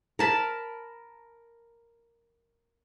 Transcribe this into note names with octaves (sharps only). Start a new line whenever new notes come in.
A#4 A5 B5